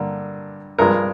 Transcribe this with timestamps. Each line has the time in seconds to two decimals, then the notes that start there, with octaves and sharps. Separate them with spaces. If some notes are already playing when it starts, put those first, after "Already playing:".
Already playing: G2 D3 A#3
0.79 G2 F3 G#3 A#4